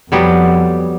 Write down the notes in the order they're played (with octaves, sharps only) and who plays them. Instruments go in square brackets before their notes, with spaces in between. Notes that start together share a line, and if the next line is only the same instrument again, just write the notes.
[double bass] F2 [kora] F#3 G3 B3